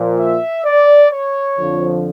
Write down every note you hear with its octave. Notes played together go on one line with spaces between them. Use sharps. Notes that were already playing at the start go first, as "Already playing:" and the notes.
Already playing: A#2 F3
E5
D5
C#5
F2 D3 F3